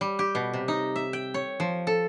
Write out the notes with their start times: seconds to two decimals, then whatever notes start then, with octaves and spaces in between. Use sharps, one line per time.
0.01 G3
0.19 G4
0.35 B2
0.54 C3
0.68 D#4
0.96 E5
1.13 G5
1.34 C#5
1.60 F3
1.87 A4